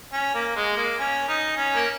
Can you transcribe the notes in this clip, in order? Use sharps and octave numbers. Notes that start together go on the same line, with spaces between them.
C#4
A#3
G#3
A#3
C#4
D#4
C#4
A#3